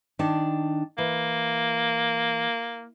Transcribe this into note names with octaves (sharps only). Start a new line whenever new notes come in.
D#3 D4 A5
E3 A#3